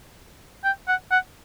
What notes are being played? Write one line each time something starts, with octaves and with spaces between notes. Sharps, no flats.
G5
F#5
F#5